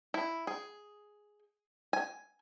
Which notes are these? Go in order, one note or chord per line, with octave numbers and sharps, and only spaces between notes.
E4
G#4
G#5